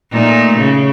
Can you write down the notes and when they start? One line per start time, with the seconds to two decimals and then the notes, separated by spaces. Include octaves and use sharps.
0.11 A#2 A3 D#4
0.58 C#3